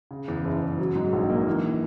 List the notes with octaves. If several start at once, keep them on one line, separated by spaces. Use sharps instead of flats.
C#3
E2
F#1
F#1
F#3
G#2
A#1
A#3
E3